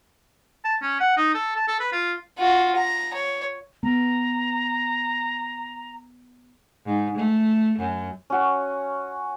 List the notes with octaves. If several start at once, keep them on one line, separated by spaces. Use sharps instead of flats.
A5
C#4
F#5
D#4
A4
A5
A4
B4
F4
F4 F#4
A#5
C#5
B3 A#5
G#2
A3
F#2
C#4 F#4